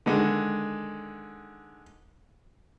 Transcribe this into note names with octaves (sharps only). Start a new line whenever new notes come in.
D3 D#3 G#3